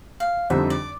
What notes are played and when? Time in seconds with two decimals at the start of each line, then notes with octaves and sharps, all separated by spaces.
0.20 F5
0.50 F2 D3 G3 C4 D#4 E5
0.70 D5